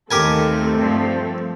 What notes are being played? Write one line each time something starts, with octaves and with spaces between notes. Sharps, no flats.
D#2 A3 C4 G4 A4 A#4 G#5
G2 F3